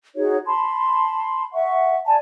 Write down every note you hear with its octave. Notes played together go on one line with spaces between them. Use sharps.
D#4 F#4 G#4 C#5
A5 B5 C6
E5 F#5 C#6
D5 G#5 A5